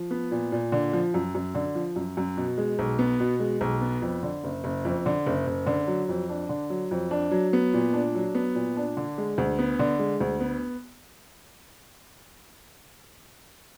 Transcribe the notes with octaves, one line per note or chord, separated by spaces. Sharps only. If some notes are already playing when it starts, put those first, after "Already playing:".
Already playing: F3
B3
A#2
A#2
D3
F3
F#2
F#2
D3
F3
F#2
F#2
B2
G#3
B1
B3
B2
G#3
B1
B3
F2
D3
F#1
F#1
F2
D3
F#1
F#1
D3
F#3
F2
D4
D3
F#3
F2
D4
F#3
B3
A#2
D4
F#3
B3
A#2
D4
D3
G#3
D2
B3
D3
G#3
D2
B3